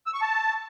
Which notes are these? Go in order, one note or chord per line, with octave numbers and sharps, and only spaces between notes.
E6
C#6
A5